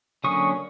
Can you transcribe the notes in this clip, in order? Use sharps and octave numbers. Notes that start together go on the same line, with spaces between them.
D3 F#3 A#3 C#4 C#6 D#6